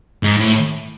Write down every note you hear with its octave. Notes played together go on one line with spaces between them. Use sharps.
G#2
A2